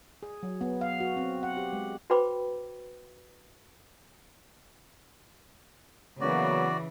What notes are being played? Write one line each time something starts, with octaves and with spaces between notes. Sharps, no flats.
G#4
F#3
B3
F5
F#4
C4
F#5
G4
G#3
F#4 B4 C5 G5 B5 D6
C#3 E3 F#3 A#3 B3 F#4 D5